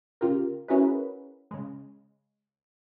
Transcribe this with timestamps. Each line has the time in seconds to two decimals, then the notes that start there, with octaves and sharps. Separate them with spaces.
0.21 C#3 F4 G4 A#4
0.68 C#4 E4 F#4 G#4 A#4 B4
1.51 C#3 G#3